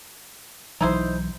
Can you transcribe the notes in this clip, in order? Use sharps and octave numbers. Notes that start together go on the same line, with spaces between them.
B1 E3 F#3 D#4 E4 C5